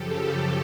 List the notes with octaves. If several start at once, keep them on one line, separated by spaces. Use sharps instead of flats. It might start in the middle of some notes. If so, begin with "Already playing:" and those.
Already playing: F#2 C#3 F3 G4 A4